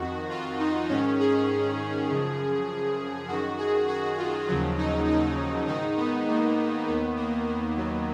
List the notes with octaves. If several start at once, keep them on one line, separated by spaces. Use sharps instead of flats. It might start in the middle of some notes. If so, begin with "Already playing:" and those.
Already playing: F2 D#3 F#4
F4
D#4
G#2 D#3 C#4
G#4
F#2 C#3 F3
F#2 D#3 F#4
G#4
F#4
F4
D#2 C#3 F3 F#3
D#4
D#4
G#2 D#3 D#4
B3
A#3
D#2 D#3 B3
A#3
A#3
F#3